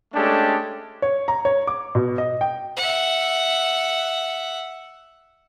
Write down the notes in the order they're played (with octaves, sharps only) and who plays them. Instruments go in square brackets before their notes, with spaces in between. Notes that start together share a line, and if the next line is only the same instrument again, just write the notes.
[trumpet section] G#3 A3 C#4 D4 G4 A4
[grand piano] C#5
A#5
C#5
D6
B2
D#5
G5
[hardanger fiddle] E5 F#5